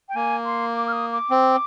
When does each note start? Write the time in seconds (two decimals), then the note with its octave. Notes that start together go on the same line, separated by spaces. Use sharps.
0.08 G5
0.15 A#3 G#5
0.45 C6
0.73 D6
0.88 F6
0.92 D#6
1.11 D6
1.31 C4